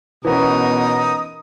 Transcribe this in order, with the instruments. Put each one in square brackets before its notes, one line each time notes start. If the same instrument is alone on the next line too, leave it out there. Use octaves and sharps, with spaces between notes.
[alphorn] B2 [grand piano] E3 B3 C#4 [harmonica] D#4 D#6 [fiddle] A#4